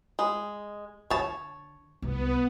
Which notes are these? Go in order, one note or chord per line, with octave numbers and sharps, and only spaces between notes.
G#3
D3 C#5 A5
C2 B3